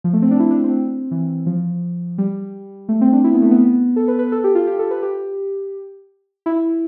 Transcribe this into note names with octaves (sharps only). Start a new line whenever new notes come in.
F3
A3
C4
D4
E4
D4
C4
E3
F3
G3
A3
C4
D4
E4
B3
A3
B3
A4
B4
B4
A4
G4
F4
G4
A4
B4
G4
E4